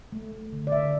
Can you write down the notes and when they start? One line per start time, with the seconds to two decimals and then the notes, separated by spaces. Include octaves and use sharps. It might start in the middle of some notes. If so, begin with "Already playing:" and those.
0.12 A3
0.32 A3
0.52 D3
0.67 D5
0.72 D3 E5